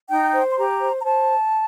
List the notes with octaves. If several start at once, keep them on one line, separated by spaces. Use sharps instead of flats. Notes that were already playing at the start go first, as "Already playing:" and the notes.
D#4 G5
C5
C6
G4 A#5
C5
A#5
C5 A5